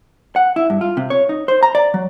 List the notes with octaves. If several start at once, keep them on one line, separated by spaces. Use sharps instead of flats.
F#5
E4
G2
F4
C3
C#5
D#4
C5
A#5
D5
F#3